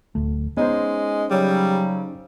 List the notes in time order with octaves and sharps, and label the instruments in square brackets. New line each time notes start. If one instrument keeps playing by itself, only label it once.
[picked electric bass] D1 D2 A3
[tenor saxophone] G#3 [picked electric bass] B3 [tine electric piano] C#4 D#4 C5
[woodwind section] C#3 F#3 [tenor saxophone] G3